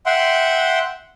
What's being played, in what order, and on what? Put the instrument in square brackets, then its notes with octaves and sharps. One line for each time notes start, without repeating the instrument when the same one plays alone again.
[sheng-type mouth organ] E5 F#5 G5 C6